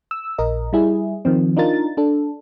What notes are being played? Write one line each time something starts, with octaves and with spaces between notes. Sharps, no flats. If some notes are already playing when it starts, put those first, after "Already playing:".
E6
A#1 A#4 D#5
G3 E4 G#4
D#3 F3 C4
D4 D#4 F4 A#4 A6
D4 A4